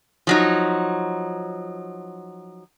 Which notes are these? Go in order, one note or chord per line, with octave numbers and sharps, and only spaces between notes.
F3 F#3 D#4